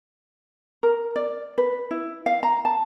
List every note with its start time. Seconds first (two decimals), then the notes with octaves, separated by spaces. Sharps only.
0.83 A#4
1.16 D5
1.58 B4
1.91 E4
2.26 F5
2.43 A#5
2.65 A5